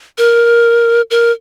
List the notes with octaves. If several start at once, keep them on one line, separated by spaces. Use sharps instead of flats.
A#4
A#4